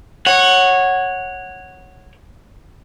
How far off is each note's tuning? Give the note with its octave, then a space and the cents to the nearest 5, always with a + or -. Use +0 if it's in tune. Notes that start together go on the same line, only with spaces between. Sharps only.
C#5 -10 F#5 +0